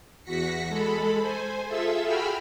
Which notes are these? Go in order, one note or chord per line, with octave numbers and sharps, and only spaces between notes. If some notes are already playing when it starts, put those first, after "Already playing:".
E2 F#4 A#6 B6 C#7
G#3 A4 B5
C5 G#5
F4 G#4 A4 E5 E6
F#4 G#4 G5 B5 E6 F6